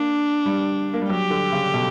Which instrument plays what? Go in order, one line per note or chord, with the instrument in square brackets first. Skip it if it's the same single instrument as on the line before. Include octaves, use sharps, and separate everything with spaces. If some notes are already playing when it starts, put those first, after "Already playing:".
Already playing: [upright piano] A#3 [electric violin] D4
[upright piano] G3
A#3
G3
[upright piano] F#3 [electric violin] G4
[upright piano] D3
C#3
B2